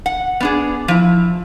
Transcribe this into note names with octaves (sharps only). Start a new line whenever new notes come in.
F#5
B3 D4 G#4
F3 E4